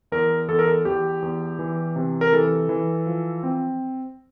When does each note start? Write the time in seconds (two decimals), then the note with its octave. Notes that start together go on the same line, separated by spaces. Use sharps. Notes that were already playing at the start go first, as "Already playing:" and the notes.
0.12 E2 A#4
0.48 E2 A4
0.59 A#4
0.68 A4
0.85 E2 G4
1.22 E2
1.59 E3
1.96 C3
2.21 A#4
2.33 E3 A4
2.69 E3
3.06 F3
3.43 C4